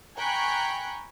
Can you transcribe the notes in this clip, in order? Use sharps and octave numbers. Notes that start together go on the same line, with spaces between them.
G5 G#5 A#5 B5 C#6 F#6